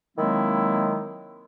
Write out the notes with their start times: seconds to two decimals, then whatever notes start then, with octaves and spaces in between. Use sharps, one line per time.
0.17 D#3 F#3 G#3 A#3 C4 E4